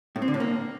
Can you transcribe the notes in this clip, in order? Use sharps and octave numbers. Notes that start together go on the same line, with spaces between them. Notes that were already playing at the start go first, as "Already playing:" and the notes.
A2
C4
D3
A2
A#3